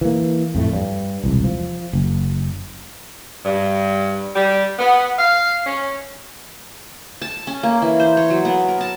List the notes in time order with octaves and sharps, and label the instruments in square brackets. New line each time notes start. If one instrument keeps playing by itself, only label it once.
[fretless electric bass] E3 A#3
F2 A2 A3
G2
E1 C2
F3
F#1
[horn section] G2
G3
B3
F5
C#4
[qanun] A5
C#4
A#3
E3
C5
C#5
F#3
B3
A#4
A5